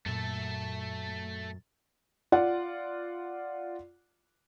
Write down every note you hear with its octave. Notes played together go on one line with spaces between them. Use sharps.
F#2 A#2 A3 A4 A6
F4 D5 F#5